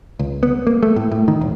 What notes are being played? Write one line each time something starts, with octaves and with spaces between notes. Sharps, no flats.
C#2
B3
A#3
A3
A2
A2
D#3
E1